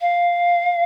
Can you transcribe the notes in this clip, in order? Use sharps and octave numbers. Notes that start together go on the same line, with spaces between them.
F5